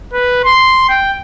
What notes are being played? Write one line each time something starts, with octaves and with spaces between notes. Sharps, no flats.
B4
C6
G5